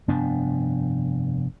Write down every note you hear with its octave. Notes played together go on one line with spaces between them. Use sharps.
F1 G2 B3 D4